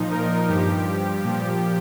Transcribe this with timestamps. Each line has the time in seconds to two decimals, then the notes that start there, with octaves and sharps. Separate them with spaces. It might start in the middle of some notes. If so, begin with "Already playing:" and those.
Already playing: A#2 F3 D#4
0.11 A#4
0.49 G2 F3 G4
1.24 A#2 F3